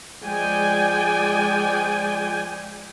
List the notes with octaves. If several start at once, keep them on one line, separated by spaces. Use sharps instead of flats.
F3 G#3 D5 G5 G#5